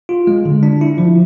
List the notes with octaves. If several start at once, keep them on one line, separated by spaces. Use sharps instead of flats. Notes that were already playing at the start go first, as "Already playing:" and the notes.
F4
G#3
D3
D4
E4
F3